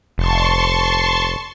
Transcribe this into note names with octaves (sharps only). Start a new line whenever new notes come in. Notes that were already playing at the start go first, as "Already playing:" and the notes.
F1 A5 C6 C#6